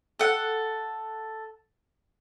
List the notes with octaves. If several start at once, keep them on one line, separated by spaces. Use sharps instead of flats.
A4 F#5